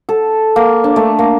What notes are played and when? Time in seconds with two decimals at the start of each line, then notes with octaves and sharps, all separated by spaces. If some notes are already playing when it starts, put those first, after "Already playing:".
0.09 A4
0.56 A#3
0.84 D4
0.96 A3
1.19 A#3